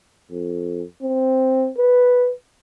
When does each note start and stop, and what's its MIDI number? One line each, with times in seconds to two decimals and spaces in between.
0.32 0.83 41
1.03 1.70 60
1.78 2.32 71